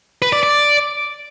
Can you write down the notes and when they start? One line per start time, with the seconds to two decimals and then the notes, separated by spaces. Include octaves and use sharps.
0.22 B4
0.33 D5
0.43 D5